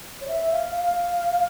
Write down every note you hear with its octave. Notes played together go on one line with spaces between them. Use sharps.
C#5
E5
F5
F5